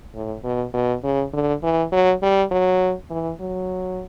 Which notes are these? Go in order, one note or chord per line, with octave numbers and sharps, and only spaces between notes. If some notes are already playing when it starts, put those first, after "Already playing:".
A2
B2
B2
C#3
D3
E3
F#3
G3
F#3
E3
F#3